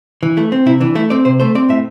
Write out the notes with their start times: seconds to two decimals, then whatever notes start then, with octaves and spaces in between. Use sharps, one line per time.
0.23 E3
0.37 A3 E4
0.52 C4
0.66 C3 E4
0.80 E3 D4
0.95 A3 E4
1.10 C4 D5
1.25 C3 C5
1.40 A3 C5
1.55 C4 D5
1.69 A2 E5